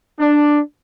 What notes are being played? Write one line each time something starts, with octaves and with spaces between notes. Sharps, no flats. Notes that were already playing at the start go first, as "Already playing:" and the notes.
D4